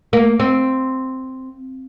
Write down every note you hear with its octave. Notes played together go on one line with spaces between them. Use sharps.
A#3
C4